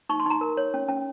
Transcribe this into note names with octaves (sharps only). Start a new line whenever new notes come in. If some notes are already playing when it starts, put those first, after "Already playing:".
D#4 C#6
C6
D#4 A#5
A#4
C#5
C#4
C#4